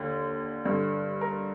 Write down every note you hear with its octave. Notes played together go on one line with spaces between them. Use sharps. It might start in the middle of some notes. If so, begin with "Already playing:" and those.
Already playing: D#2 D3
G2 D3
A#4